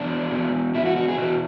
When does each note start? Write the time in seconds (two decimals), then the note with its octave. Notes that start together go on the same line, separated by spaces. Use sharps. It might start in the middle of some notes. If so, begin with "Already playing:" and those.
Already playing: E2 B2 D4
0.31 E2 B2
0.74 E2 B2 E4
0.85 F#4
0.96 F#4
1.08 G#4
1.18 E2 B2 F#4